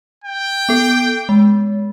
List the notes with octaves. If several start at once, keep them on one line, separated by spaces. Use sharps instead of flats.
G5
B3 A4
G#3